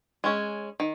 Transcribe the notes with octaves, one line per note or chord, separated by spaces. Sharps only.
G#3 C#4
D#3